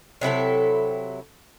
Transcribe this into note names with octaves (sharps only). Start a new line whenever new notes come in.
C3 F#3 E4 A4